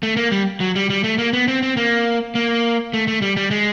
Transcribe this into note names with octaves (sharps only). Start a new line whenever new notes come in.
A3
A#3
G3
F#3
G3
G3
A3
A#3
B3
C4
C4
A#3
A#3
A3
A3
G3
G3
G#3